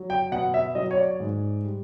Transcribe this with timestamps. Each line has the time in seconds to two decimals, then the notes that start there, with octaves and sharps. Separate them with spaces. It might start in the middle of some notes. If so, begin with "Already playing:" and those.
Already playing: F#3
0.10 G5
0.32 B2 F#5
0.54 E5
0.75 F#3 D#5
0.91 C#5
0.97 D5
1.20 G#2
1.63 G3